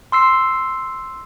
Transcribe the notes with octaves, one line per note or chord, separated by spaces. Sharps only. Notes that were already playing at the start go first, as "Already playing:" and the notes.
C6 E6 C7